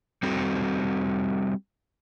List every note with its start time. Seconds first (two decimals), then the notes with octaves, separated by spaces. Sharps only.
0.23 G3 C4 F#4 A4